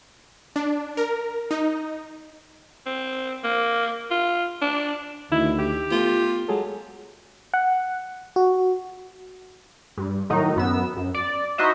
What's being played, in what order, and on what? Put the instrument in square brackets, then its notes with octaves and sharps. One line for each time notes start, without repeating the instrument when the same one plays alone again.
[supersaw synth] D4
A#4
D#4
[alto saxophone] C4
A#3
F4
D4
[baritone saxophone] D2 [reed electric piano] D#3 D#4 [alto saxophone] E4
[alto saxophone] G4
[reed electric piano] A3 B3 [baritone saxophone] F4
[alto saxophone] F#3 [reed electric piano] G#3 G#4 A4
[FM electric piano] F#5
F#4
[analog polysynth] G2
A2 D#3 F#3 D#4
F#2 B3 E6
F#2
D5
D#4 E4 F#4 C5 D#5 E5